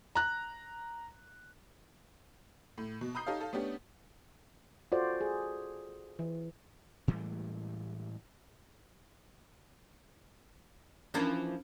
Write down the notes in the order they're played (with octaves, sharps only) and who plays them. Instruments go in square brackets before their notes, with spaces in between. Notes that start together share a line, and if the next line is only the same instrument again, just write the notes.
[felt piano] A#5 F#6
[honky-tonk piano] A2
B2
A#5 B5 D#6 G6 C7
D#4 G4 A4 C#5 F5
A4 F5
A3 B3 C#4 D4 G4
[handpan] F4 F#4 A4 C5 D5
G#4
E3
[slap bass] A2 E3 G3 G#3
[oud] E3 F3 A#3 [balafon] C#4 D4